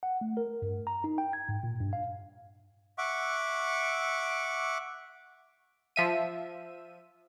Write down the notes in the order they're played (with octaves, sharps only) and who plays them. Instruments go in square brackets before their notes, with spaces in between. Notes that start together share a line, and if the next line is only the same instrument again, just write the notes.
[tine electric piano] F#5
A3
A#4
G2
A#5
D#4
G5
G#6
G#2
A#2
G2
F5
[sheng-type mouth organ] E5 F#5 C#6 D6
[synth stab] F3 E5 D#7